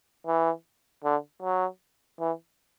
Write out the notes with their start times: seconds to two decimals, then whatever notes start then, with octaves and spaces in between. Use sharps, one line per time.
0.27 E3
1.04 D3
1.42 F#3
2.20 E3